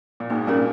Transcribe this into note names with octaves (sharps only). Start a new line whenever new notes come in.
A#2
G#2 B2 A#3
G2 A#2 C#4 G4 A#4